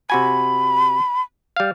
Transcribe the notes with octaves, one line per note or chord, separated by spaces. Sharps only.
C3 F#4 G#5 B5
G3 F5